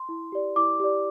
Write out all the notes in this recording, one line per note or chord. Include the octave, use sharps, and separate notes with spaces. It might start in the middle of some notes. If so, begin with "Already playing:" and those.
Already playing: C6
E4
G4 D5
E4 D6
G4 D5